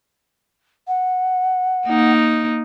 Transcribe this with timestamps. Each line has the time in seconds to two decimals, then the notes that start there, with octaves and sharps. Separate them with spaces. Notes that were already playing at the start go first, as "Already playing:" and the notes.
0.88 F#5
1.87 A#3 D#4